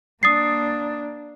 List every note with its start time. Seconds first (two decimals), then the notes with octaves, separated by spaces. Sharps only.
0.23 A#3 D4 D#6 A6 C7